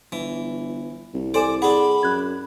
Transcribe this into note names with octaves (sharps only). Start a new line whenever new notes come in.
G1 E3
C2
A4 C5 D5 G#5 E7
D4 G#4 F#5 B5
F#2 F#6 G#6